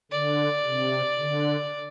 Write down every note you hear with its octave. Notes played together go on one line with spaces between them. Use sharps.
D3 D5
C3
D3